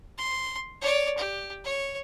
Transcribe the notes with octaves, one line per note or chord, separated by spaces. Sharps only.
C6
C#5 D5
G4
C#5